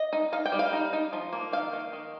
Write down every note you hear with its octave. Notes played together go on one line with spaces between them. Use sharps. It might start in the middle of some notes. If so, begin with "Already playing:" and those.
Already playing: D#5
D#4
D#4 F5
G5
G3
F5
D#4
D#4
F3
A#3
D#3 F5
D#3
D#3